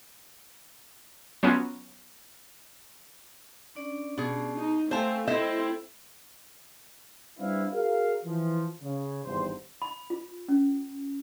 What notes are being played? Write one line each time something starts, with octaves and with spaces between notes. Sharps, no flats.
F#3 B3 C#4 F4
C#4 D4 D5
B2 G#4
D#4
A3 C4 A4 C5 F5 G#5 A5
C4 E4 A4 C5 D#5 E5
G3 C4 D4 E4 B4 F5
F#4 G#4 A#4 F5
E3 F3
C#3
G#1 E2 G2 C5
B5
F4
C#4